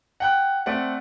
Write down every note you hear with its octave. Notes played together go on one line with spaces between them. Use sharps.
F#5 G5 F#6
A3 C4 D5 F#5